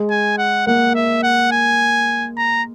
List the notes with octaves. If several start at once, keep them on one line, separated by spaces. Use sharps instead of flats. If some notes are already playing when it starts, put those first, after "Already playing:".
Already playing: G#3 G#4
G#5
F#5
A#3 A#4 F#5
E5
F#5
G#5
A#5